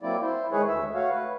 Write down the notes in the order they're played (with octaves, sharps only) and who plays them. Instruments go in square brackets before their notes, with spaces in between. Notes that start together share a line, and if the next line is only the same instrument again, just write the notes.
[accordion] F#3 A#3 C4 E4 D5
E4 C5
D#3 G#3 G#4 B4 C#5
D2 A3 E5
A3 F#4 C#5 F5
B4